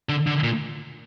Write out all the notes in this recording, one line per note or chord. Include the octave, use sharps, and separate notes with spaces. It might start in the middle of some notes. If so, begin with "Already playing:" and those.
D3
D3
A#2